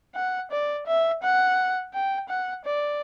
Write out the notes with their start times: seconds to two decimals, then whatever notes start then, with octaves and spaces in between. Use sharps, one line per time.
0.15 F#5
0.51 D5
0.87 E5
1.23 F#5
1.94 G5
2.29 F#5
2.65 D5